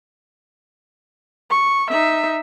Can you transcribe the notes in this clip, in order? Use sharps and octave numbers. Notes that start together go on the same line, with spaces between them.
C#6
D#4 E5